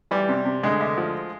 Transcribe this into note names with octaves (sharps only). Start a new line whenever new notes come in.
E3 G3
C3
C3
D2 G#3
D2
F3